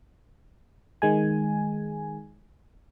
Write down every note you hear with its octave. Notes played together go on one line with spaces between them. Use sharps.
D#3 G#3 G#5